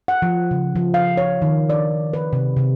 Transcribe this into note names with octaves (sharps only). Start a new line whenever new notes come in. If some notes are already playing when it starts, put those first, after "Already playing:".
F#5
F3
C#3
F3
F5
C#5
D#3
D5
B4
C3
C3